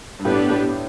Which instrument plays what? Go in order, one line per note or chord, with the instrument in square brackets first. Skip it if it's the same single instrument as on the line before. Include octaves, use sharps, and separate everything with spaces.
[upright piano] G2
[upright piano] A2 [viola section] B3 D4 G4 B4
[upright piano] A2